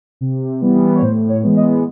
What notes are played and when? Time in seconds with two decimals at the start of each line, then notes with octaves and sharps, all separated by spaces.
0.21 C3
0.61 E3 G3 B3
0.95 C#5
1.02 A2 C5
1.29 C#5
1.43 E3 G#3 B3
1.57 D#5